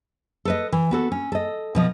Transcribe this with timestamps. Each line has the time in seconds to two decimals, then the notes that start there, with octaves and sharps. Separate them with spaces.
0.45 A4 B4 D#5
0.72 E3
0.91 B3 F#4 A4
1.12 C#4
1.32 A4 D#5
1.75 B2 F3 D#5